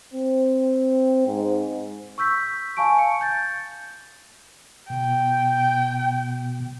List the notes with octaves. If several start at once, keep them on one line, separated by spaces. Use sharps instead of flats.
C4
G#2
C#6 E6 G6 B6
F5 G#5 A5 C#6 D7
C#7
G6 A6
B2 G5